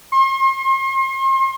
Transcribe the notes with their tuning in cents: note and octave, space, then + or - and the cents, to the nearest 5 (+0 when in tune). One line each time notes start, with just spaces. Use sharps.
C6 +40